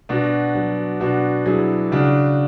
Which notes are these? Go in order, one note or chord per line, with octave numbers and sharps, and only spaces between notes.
B2 D4 F#4
F#3
B2 D4 F#4
F#3 E4 G#4
C#3 D4 F#4